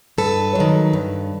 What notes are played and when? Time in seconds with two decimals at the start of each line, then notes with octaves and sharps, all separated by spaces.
0.18 G2 A4 B4
0.55 D#3 F#3
0.93 G2